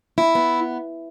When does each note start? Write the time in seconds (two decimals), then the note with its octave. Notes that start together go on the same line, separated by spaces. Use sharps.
0.18 E4
0.35 B3